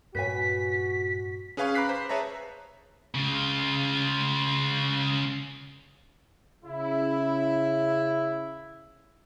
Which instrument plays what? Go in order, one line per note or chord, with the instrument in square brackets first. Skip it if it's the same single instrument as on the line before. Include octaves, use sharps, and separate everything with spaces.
[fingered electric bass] G2 A#2 [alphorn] F#4 [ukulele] B4 C#5 G#5 [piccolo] B6
[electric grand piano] C#4 G#4 B4 F5 G#5 C#6
A#5 B5 D6 F#6 B6 C7
C5
G#4 B4 C#5 E5 A5 A#5
[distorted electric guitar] C#3 F4
[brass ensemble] C#3 E4